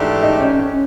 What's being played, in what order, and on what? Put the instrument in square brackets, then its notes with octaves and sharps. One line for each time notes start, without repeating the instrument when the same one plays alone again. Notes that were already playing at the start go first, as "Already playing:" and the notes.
Already playing: [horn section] G#2 E3 A3 D4 G4
[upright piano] D#4
C#4
C#4